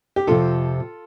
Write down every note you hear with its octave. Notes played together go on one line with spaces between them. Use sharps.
G4
F2 C3 F3 F4 A4